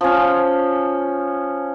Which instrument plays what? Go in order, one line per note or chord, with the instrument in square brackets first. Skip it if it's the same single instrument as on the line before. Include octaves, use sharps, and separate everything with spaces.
[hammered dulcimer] F3 C#4